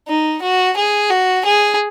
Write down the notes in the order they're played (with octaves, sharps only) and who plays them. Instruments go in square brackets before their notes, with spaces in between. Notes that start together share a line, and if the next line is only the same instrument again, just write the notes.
[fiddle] D#4
F#4
G#4
F#4
G#4